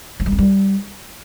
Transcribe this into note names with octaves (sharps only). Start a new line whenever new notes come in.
F#3
G3
C4
G3